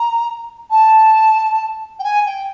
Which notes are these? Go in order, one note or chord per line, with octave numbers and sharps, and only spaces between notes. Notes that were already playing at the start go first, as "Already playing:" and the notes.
Already playing: A#5
A5
G5
G#5
G5